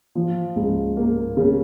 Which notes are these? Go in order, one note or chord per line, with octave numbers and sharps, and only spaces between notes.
F3
C#2
A#3
C#3